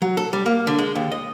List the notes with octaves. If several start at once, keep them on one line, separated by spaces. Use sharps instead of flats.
F#3
A4
G3
A#3
D3
G#3
D#2
D#5